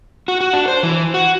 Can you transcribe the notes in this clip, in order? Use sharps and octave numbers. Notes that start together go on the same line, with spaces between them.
F#4
F#4
D4
C5
E3
F#4